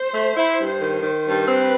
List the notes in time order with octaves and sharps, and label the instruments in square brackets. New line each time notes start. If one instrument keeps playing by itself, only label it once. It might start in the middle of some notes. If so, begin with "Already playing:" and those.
Already playing: [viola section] C5
[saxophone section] A3
E4
G2
D#3
D#3
G2
[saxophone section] C4 [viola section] B4